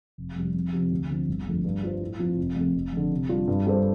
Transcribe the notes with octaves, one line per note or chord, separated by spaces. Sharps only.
F1
F2 C3 G3
F2
C3 F3 C4 G4
D2
D3 F3 C4
G1
F2 D3 F3 A3
G2
G3 F4 C5
A2
F3 C4 F4
F1
F2 C3 A3
F1
F2 D3
C3
G3 D4 F4
G2
G3 D4 A4 C5